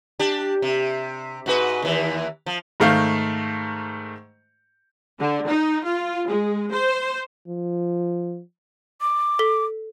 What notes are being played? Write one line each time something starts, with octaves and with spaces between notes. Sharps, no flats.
D4 G4
C3
G#2 F#4 B4
D#2 E3
F3
G#2 D#3 A3 F5 G6
D3
D#4
F4
G#3
C5
F3
D6
A4 B6 G7